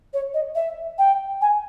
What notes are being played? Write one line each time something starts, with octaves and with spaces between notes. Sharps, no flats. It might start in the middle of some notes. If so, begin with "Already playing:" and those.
C#5
D#5
E5
G5
G#5